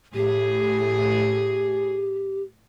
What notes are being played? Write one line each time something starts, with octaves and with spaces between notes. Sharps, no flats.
A2 G4 G#4